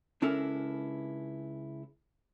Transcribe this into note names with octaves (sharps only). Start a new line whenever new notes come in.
C#2 C#4 D4 E4 A4 A#4